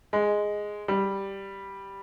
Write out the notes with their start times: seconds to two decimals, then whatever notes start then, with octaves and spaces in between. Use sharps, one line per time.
0.13 G#3
0.88 G3